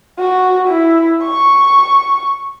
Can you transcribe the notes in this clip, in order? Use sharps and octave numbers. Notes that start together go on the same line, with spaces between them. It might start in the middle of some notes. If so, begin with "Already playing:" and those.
F#4
E4
C#6